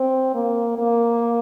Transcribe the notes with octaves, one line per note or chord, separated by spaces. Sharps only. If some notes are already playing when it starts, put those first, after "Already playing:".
Already playing: C4
A#3
A#3